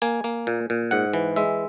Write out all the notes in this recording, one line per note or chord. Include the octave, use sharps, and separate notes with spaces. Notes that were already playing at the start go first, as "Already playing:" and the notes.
A#3 G#5
A#3
A#2
A#2
G#2 F#5
E3
G#3 E5